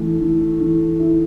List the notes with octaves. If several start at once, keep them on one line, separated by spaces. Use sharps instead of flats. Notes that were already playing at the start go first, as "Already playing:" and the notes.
Already playing: E3 A3
E3
E3
E4